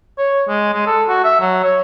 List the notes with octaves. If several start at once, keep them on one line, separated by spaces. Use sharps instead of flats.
C#5
G#3
G#3
A4
F#4
E5
F#3
C#5